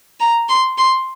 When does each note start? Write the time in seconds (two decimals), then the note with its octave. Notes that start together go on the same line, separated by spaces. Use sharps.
0.20 A#5
0.49 C6
0.78 C6